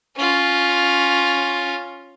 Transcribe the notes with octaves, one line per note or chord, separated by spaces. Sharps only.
C#4 F4